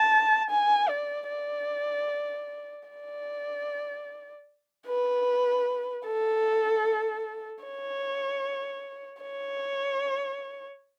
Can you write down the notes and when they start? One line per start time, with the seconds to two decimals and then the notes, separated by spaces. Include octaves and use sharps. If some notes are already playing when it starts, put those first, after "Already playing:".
Already playing: A5
0.50 G#5
0.89 D5
1.29 D5
2.89 D5
4.87 B4
6.06 A4
7.64 C#5
9.23 C#5